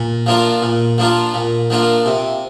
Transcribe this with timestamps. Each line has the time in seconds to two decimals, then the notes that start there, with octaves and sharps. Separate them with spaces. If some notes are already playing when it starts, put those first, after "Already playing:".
Already playing: A#2
0.26 F3 A#3 D4 F4
0.62 A#2
0.98 F3 A#3 D4 F4
1.34 A#2
1.70 F3 A#3 D4 F4
2.06 C3